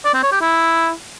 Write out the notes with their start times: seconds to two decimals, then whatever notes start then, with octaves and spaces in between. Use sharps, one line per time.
0.05 D5
0.14 C4
0.23 C#5
0.32 G4
0.41 E4